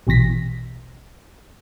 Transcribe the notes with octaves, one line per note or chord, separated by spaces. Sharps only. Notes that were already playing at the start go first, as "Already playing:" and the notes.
A#1 B2 E3 A#6 B6